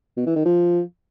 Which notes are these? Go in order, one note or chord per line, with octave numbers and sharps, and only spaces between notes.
B2
E3
D#3
F3